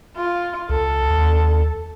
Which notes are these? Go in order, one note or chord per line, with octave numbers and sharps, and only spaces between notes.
F4
C#2 A4
D#2